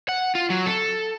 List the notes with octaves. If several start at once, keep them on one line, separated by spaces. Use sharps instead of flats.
F#5
F4
F#3
A4